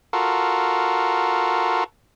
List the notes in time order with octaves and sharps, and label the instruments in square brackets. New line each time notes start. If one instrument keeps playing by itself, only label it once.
[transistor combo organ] F4 F#4 A4 A#4